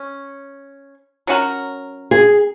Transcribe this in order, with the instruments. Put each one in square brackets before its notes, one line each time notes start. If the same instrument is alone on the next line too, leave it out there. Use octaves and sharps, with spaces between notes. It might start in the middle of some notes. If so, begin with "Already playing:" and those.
Already playing: [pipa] C#4
F#3 C#4 F#4 A#4
[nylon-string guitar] G#4